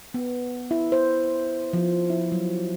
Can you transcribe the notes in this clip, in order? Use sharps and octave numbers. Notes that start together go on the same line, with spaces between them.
B3
E4
C5
F3
E4
F#3